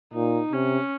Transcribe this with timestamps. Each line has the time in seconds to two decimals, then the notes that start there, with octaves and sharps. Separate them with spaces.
0.14 A#2 D#4
0.52 C3 C#4